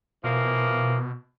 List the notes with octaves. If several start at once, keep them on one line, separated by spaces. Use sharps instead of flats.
B2 E3 F3 A#3